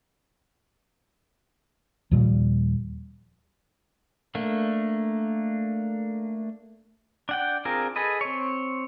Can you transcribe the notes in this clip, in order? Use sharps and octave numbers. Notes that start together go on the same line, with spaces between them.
D#2 A#2 F3 G3
A3 A#3 D4
D4 F#5 G5
C4 D4 F4 G#4 A#4
G#4 A4 B4 D#5
C4 C#5